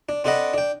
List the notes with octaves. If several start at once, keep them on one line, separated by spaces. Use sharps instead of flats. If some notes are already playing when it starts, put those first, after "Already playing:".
D4
C4 D4 A4 D#5 F#5 B5
D4 G5